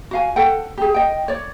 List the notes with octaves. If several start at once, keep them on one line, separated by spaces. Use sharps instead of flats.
F#4 F5 G#5
A4 F#5 G5
G4 G#4
D#5 G5
C#5 D5